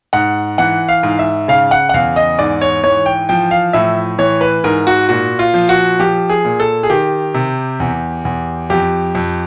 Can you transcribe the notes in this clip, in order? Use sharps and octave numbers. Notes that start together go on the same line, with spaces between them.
G#2 F#5
E3 F#5
F5
G#2
E5
C#3 F5
F#5
F#5
E2 F5
D#5
G#2 D5
C#5
E3 C#5
G5
F3 G5
F5
A2 E5
E3 C#5
B4
G#2 A#4
F#4
A#2 F#4
F4
F3
F#4
F3 G4
G#4
A#2
A4
G#4
D#3 G4
C3
E2
E2
F2 G4
F2